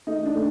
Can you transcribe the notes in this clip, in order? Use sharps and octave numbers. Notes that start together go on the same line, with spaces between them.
A3 D#4
D4
A3